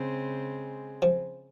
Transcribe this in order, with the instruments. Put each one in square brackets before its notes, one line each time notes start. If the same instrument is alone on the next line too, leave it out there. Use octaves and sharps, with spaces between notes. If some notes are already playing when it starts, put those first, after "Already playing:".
Already playing: [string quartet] C#3 G#3 C4
[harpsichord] F3